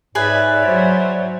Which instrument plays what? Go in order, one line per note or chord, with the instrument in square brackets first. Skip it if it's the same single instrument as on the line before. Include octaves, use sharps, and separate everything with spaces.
[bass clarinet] G#2 [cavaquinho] G#4 B4 G#5 [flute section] C#5 D5 E5
[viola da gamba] F#3 [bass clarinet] C5